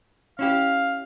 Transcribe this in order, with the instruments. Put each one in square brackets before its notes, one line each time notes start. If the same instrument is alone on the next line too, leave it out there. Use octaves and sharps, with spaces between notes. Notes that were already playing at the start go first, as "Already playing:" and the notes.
[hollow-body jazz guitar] C#4 E4 G4 [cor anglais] F5